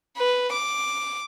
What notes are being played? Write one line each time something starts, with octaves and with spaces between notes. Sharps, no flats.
B4
D6